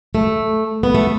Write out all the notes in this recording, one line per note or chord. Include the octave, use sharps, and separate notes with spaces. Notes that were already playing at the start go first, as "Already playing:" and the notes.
A3
B3
A3